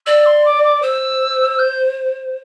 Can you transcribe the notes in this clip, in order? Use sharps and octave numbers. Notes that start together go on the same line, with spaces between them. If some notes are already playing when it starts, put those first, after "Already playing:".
D5 E6
C6
D6
D6
C5 E6
E6
G6